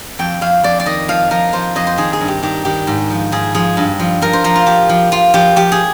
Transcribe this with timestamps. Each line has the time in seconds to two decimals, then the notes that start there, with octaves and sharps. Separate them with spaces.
0.19 F2 G5
0.41 F2 F5
0.63 F2 D5
0.80 D5
0.86 D#3 D#5
1.08 F3 F5
1.31 F3 A#4
1.53 F3 C5
1.75 F2 D#5
1.87 C5
1.98 D#3 G#4
2.13 G#4
2.20 G2
2.28 G4
2.42 D#3 G4
2.65 D#3 G4
2.87 G#2
3.10 F3
3.32 G#2 G#4
3.55 F3 G#4
3.77 G2
3.99 F3
4.21 F3 A#4
4.33 C5
4.44 F3 A#4
4.55 F4
4.66 F3 G4
4.89 F3
5.11 F3 F4
5.34 F3 G4
5.56 F3 G4
5.72 G#4